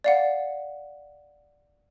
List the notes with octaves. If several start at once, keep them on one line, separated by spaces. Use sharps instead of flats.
D5 F5 F#5